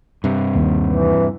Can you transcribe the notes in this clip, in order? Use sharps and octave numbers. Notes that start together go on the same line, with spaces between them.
G2 C3
D#2
E3